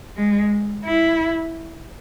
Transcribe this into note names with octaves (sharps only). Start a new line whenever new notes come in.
G#3
E4